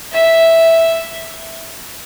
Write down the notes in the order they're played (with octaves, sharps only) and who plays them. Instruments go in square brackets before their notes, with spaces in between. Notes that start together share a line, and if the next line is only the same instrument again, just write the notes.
[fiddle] E5